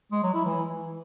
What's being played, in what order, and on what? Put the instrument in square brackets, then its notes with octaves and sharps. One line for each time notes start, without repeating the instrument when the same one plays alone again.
[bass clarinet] G#3
F#3
E4
E3